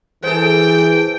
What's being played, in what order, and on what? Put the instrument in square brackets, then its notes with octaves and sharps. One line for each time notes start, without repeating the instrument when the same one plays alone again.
[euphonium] E3 [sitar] G#4 A4 [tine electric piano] C5 [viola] G5